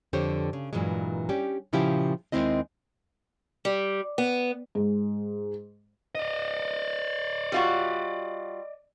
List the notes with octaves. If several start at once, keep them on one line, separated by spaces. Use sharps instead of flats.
F2 D3 G4 C5 C#5
C#3
G2 A#2 E3 F#3 G#3
G3 C#4 G4
A#2 C#3 F3 E4 F4 G4
D#2 D3 G#3 C4 E4 D#5
G3
B3
G#2
D5 D#5
G3 F4 F#4